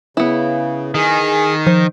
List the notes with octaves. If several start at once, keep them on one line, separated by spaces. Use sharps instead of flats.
C#3 B3 E4
D#3 G#4
F3 C5